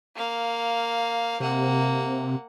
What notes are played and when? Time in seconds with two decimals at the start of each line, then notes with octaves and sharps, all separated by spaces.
0.16 A#3 F5
1.40 C3 A#3 F#5